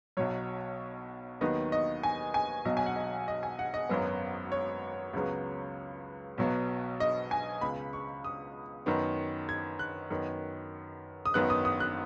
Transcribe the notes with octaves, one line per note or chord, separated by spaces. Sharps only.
B1 B2 F#3 C#5
D#2 D#3 F#3 B3 D#5
D#5
G#5
G#5
B1 B2 F#3 D#5
G#5
F#5
D#5
D#5
G#5
F#5
D#5
G#1 F#2 F#3 B3
C#5
C#2 C#3 F#3 B3
B1 B2 F#3 B3
D#5
G#5
C#2 C#3 B3 B5
C#6
D#6
F#2 D#3 B3
G#6
F#6
F#2 D#3 B3
D#6
G#1 F#2 D#3 B3 F#6
D#6
D#6
F#6